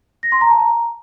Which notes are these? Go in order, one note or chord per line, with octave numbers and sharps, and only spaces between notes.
A#6
C6
A#5
A5
A#5